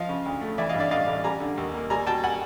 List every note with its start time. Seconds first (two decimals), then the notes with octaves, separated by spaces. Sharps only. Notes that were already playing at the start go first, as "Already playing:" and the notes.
Already playing: F3 D#5 F5
0.09 C#3
0.26 D2
0.41 A3
0.58 E3 D5 E5
0.69 G2 D#5 F5
0.80 D5 E5
0.91 A1 D#5 F5
1.07 A1
1.24 G3 G#5 A#5
1.40 D3
1.57 D#2
1.74 A#3
1.90 G3 G#5 A#5
2.07 B2 G5 A5
2.23 F#5 G#5